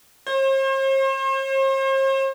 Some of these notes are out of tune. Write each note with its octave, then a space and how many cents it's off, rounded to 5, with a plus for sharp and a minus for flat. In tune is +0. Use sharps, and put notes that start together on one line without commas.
C5 +45